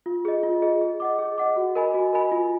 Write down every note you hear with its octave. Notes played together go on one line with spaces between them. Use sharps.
F4
G#4 D#5
F4
G#4 D#5
G#4
D#5 F#5 D6
G#4
D#5 F#5 D6
F#4
A#4 D#5 G#5 B5
F#4
A#4 D#5 G#5 B5
F4